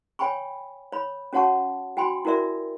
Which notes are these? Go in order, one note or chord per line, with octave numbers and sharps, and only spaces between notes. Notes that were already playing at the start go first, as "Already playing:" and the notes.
C#5 G5 G#5 B5 C#6
C#5 B5
C#4 F#4 C#5 F#5 A5 C#6
F#4 G5 G#5 B5 C6
E4 F#4 A#4 D5 E5